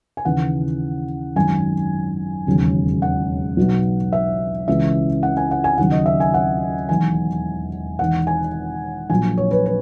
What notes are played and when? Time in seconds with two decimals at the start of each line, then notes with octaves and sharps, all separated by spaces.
0.17 G#5
0.25 D#2 C#3 E3 F#5
1.35 G#1 F#2 D#3 G#5
2.47 E1 D#2 C#3 F#3
3.02 F#5
3.57 B1 B2 F#3
4.13 E5
4.68 C#2 C#3 E3 E5
5.23 F#5
5.37 G#5
5.51 F#5
5.64 G#5
5.78 D#2 C#3 F#3 F#5
5.92 D#5
6.06 E5
6.20 G#5
6.34 F#5
6.89 E1 E2 D#3 F#3 G#5
7.99 E1 E2 D#3 F#5
8.27 G#5
9.10 A#1 A#2 F#3 G#5
9.38 C#5
9.51 B4
9.66 B4